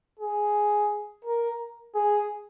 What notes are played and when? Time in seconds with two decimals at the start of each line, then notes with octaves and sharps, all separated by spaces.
0.19 G#4
1.25 A#4
1.95 G#4